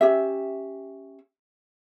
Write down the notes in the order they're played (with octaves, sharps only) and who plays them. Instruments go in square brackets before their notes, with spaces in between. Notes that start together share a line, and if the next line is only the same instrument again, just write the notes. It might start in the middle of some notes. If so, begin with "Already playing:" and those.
[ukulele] C#4 G4 E5